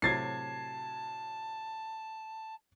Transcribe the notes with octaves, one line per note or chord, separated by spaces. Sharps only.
A2 C3 F#3 A5 G#6 A6 C7